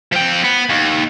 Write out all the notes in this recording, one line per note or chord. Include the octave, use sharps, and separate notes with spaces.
F3 G5
B3
D#2